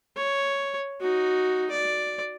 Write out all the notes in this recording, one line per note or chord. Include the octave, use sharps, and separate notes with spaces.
C#5
D#4 F#4
D5